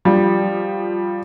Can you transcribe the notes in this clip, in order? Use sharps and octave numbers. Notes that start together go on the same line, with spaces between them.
F3 G3